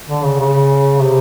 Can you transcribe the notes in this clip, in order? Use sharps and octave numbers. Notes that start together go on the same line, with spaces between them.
D3
C#3
C#3
C3